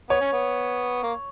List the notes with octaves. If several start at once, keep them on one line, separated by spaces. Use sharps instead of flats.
B3 C#5
C#4
B3
A#3